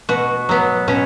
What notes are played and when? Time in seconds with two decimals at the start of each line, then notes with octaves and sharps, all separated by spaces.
0.09 B2 F#4
0.49 F#3 B3
0.88 B2 C#4